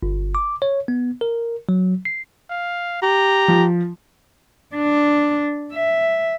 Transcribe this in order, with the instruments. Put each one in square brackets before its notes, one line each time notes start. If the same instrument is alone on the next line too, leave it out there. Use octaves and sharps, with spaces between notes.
[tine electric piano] G1
D6
C#5
B3
A#4
F#3
C7
[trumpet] F5
[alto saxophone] G4 [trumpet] A#5
[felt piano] F3
[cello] D4
E5